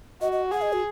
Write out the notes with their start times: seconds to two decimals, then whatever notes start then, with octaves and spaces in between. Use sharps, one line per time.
0.21 F#4 D#5
0.32 D#5
0.52 G#4 F#5
0.62 D#5
0.73 F#4